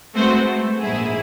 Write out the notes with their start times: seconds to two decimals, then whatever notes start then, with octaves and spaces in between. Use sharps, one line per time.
0.15 G#3 A3 B3 C4 F#4 C5
0.45 A3
0.80 A#1 G#2 E4 G#4